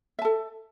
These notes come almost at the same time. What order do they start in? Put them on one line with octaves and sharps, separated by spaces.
E5 A5 A4